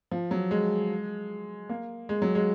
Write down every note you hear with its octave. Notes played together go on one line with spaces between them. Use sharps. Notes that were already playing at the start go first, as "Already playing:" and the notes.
F3
F#3
G#3
A#3
G#3
F#3
G#3